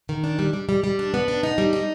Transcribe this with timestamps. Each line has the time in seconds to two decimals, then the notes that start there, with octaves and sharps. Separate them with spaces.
0.09 D#3
0.24 D4
0.39 G3
0.53 G3
0.69 G3
0.84 G3
0.99 D4
1.14 B3
1.28 D4
1.43 D#4
1.58 G3
1.73 D#4